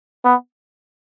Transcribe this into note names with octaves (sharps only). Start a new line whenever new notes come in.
B3